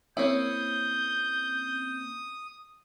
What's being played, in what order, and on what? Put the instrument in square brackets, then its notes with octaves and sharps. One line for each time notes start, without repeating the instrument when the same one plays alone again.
[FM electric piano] A#3 C4 C#4 [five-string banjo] E4 C#5 [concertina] D#6 [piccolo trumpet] G6